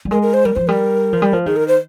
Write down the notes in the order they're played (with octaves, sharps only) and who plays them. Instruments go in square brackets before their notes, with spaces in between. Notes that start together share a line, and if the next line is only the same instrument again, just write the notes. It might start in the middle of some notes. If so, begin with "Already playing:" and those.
[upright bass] G3
[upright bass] G#3 [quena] A#4
[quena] A#4
C5
[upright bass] G3 [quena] A#4
[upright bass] F3 [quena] C5
[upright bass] G3 [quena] A#4
[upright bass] F3
G3
F3
[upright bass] D#3 [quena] G#4
[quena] A#4
C5